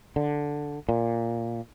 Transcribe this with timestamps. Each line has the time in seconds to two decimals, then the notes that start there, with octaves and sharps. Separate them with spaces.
0.16 D3
0.89 A#2